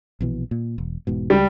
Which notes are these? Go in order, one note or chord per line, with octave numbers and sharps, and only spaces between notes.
A#1 B2 E3
A#2
E1
E1 G#2 B2
C#2 G3